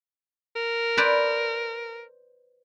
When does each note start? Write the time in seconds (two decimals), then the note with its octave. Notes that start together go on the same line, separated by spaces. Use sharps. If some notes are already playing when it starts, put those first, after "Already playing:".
0.56 A#4
0.97 B4 C5 D5